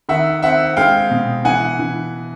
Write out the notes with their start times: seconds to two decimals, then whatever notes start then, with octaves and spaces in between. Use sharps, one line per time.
0.09 D#3 E5 F#5
0.42 C4 E5 F#5
0.77 G#3 F5 G5
1.11 B2
1.45 E3 F#5 G#5
1.79 E3